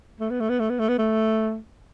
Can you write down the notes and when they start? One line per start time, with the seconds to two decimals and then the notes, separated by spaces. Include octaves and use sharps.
0.20 A3
0.30 B3
0.40 A3
0.49 B3
0.60 A3
0.70 B3
0.79 A3
0.89 B3
0.99 A3